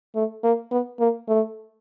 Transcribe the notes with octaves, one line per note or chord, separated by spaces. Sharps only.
A3
A#3
B3
A#3
A3